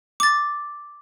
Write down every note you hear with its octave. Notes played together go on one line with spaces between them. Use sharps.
D6 A6